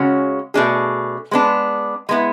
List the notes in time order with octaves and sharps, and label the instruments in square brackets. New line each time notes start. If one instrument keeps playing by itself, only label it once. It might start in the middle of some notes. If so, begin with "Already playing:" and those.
Already playing: [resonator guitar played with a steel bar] C#3 G#3 C#4 F#4
B2 A3 D4 G#4
G#3 B3 D4
G#3 B3 E4